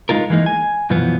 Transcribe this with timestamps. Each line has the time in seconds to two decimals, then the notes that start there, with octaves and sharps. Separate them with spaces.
0.09 G#3 D#4 F4 A#4
0.30 E3 G#3 A#3 D#4
0.46 G#5
0.90 F#2 B2 E3 F3 B3